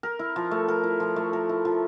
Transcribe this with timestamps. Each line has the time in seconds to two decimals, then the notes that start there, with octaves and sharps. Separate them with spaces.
0.03 A#4
0.19 E4
0.36 F3
0.51 A3
0.68 A#4
0.84 E4
1.00 F3
1.16 A3
1.33 A#4
1.49 E4
1.65 F3